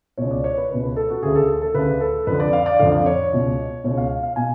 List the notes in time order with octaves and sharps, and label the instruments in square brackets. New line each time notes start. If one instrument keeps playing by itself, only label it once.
[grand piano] C#2 B2 C#5
D5
C#5
B4
C#2 B2 B4
B4
A4
F#4
D2 C#3 G#4
A4
A4
D2 C#3 B4
A4
F2 D3 B4
D5
F5
D5
F2 D3 F5
D5
C#5
C#2 B2
C#2 B2 C#5
F5
F5
B2 G#5